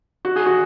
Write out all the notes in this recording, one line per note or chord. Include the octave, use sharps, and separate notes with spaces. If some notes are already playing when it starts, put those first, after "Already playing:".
F#4
G#4
F#4